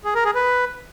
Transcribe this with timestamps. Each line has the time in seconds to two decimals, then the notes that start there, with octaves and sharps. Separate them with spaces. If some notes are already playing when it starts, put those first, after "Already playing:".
0.04 G#4
0.15 A#4
0.25 G#4
0.35 B4